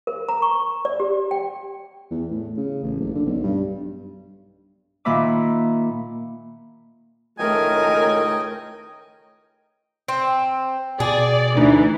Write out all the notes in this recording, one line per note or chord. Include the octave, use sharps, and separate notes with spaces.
A#4
A#5
C#6
D5
G4
G5
E2
A2
C#3
A1
F#1
D3
B1
G2
A#2 D#3 A#3 E5 B5 D6
C#2 A2 D#3 A3 A#4 D#5 G5 G#5
C4
B2 G#4 D5
D2 E3 D#4